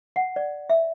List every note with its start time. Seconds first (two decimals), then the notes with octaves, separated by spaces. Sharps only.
0.16 F#5
0.36 D5
0.70 E5